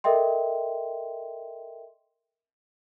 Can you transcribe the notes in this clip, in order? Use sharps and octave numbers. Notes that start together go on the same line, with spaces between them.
A4 A#4 D#5 E5 G5 C6